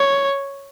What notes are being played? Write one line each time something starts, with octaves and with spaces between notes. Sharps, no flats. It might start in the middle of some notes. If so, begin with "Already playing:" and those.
Already playing: C#5